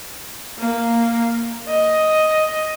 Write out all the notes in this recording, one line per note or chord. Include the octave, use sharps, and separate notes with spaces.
A#3
D#5